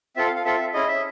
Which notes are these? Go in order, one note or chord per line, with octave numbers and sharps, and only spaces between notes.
C4 F4 A4 E5
F5
F5
C4 F4 A4 E5
C#4 E4 G#4 D#5
E5